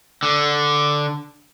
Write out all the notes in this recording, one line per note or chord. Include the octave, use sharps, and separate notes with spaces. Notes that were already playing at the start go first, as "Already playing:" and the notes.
D3